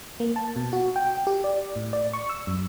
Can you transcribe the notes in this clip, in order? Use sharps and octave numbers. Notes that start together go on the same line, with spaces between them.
A#3
A5
B2
F#4
G5
G4
D5
A2
D5
C#6
E6
F#2